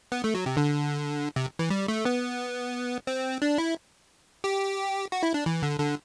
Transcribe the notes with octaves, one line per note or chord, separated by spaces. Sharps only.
B3
A3
F#3
C3
D3
C3
E3
G3
A3
B3
C4
D4
E4
G4
F#4
E4
D4
E3
D3
D3